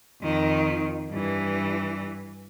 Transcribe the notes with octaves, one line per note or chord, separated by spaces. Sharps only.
F2 D#3
G2 E3